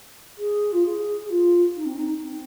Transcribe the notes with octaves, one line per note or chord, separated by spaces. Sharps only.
G#4
F4
G#4
G#4
F4
D#4
C4
D#4
C4